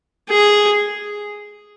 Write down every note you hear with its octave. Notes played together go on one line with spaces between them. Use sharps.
G#4